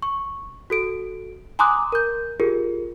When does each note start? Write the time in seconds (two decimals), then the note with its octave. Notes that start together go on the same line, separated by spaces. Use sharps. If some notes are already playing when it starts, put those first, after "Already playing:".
0.02 C#6
0.70 F#4 A4 D7
1.59 G#5 A#5 C6 D6 D#6 F#6
1.92 A#4 G6
2.40 F4 G4 G#4 A#4